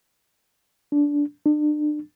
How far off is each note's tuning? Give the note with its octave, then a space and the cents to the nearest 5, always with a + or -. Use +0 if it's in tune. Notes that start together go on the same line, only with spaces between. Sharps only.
D4 -15
D4 +35